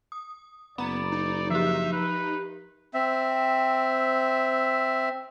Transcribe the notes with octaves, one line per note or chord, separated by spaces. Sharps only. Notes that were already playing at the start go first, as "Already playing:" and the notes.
D#6
F#1 B3 D5 A#5 B5
D#4
F3 G4 E5
B4
C4 E5